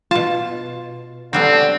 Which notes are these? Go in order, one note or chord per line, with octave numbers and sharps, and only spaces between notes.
B2 F4 A5
D3 F#3 G3 B3 C4